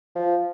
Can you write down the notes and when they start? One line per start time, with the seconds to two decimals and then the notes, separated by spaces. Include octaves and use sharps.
0.15 F3